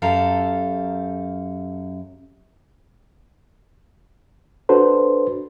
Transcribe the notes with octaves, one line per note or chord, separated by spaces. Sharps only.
F#2 G4 A4 F5 A#5
D4 F#4 A4 B4 C5